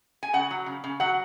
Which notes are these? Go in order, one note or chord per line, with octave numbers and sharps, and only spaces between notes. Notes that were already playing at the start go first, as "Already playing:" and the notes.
G#5
C#3 F#5
F#3
C#3
C#3
F#3 F#5